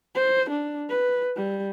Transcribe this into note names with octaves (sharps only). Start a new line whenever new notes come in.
C5
D4
B4
G3